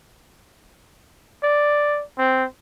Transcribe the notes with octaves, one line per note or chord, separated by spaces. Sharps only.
D5
C4